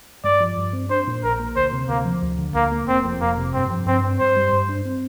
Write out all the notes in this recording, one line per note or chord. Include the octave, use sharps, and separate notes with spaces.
G2 D5
F3
G2
C4
D4 C5
A#2
A#1 A#4
A#3
D2 C5
C3
D2 A#3
F3
D2
D3
D2 A#3
A#3
F1 C4
F2
F1 A#3
C3
G2 C4
F3
G2 C4
C4
G2 C5
G3
G2
D4
C4